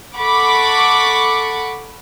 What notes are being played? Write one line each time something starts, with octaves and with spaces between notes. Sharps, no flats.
A4 F#5 B5 C#6 D6